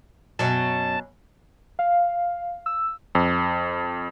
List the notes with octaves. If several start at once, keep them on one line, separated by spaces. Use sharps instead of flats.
F#2 B2 F#3 A5
F5
E6
F2